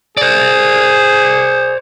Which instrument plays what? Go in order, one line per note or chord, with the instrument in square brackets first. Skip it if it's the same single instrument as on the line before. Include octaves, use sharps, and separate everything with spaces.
[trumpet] G#4 [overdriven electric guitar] C5 D5